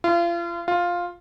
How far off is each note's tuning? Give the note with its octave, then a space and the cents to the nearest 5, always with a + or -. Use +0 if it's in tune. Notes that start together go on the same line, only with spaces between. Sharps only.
F4 -35
F4 +5